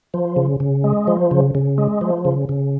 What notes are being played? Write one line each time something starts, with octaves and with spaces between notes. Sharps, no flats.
F3
C#3
C#3
G#3
F3
C#3
C#3
G#3
F3
C#3
C#3